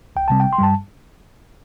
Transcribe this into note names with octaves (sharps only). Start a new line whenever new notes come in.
C2 G5
C3 G3 C4 A5
G1 G5
C6
G2 G3 A5